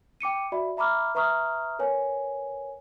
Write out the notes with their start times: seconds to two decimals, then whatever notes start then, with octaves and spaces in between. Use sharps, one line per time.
0.21 G5 D6 C#7 D#7
0.52 F#4 D5 E5 B5
0.77 E5 A#5 B5 D6 F6
1.15 B4 E5 A#5 C#6 D#6 F6
1.79 A#4 B4 C#5 G#5